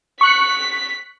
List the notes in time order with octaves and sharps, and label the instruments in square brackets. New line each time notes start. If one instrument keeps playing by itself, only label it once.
[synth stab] C#6 F#6 C#7 [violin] B6